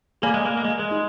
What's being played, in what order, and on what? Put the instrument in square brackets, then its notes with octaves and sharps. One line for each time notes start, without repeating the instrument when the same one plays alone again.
[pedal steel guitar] A#3 [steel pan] G#4 D5 G#5 B5
[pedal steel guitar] G#3
A#3
A#3
G#3
G#3
[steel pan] D#4 G#4